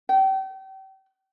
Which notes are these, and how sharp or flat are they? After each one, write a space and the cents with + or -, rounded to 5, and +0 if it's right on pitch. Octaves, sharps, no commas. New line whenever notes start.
G5 -35